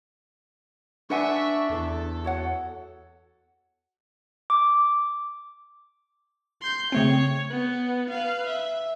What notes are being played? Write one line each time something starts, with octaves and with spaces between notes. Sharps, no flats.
D4 B4 E5 F#5 G#5 C#6
E2 A4
F#4 C#5 F#5
D6
C6 G6
C#3 A3 C4 C#5
B3
B4 F5
E5